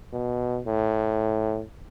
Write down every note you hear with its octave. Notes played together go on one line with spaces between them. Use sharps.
B2
A2